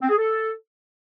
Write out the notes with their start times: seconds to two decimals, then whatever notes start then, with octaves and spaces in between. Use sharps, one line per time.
0.02 C4
0.10 G#4
0.18 A4